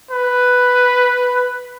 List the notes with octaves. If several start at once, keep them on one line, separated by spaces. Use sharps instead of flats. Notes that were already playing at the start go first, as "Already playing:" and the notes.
B4